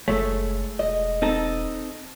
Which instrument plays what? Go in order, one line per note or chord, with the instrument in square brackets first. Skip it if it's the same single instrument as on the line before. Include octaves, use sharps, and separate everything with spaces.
[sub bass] F#1 [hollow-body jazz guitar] G#3 A3 [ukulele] A4 C#5
[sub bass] E1 [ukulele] D#5
[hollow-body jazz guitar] C4 D#4 A4